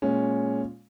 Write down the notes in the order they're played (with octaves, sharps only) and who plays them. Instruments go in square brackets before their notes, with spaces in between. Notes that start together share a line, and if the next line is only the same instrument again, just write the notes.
[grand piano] A#2 G#3 C#4